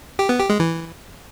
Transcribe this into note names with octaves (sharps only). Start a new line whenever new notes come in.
G4
B3
G4
G#3
E3